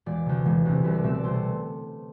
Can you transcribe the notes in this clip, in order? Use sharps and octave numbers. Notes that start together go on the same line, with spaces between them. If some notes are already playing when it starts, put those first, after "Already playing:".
E1 D5
D2 C3
E1
D2 C3
C2 B4
D5
B2 A3 C4 E5
D5
C2 C5
A4